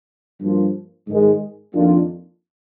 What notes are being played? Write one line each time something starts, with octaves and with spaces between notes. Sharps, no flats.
G2 F3 A#3 F4
G#2 D#3 G#3
F2 D#3 A#3 D4 F4